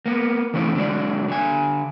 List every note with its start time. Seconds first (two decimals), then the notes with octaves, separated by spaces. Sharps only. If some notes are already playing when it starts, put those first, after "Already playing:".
0.06 A#3 B3
0.54 E3 A3 C4 C#4 D#4 E4
0.75 D3 F#3 G#3 D5
1.28 D3 G#5